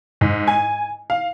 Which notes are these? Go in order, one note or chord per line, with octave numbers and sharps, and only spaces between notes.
G#2
G#5
F5